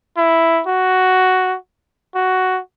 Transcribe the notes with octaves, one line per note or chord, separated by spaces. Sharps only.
E4
F#4
F#4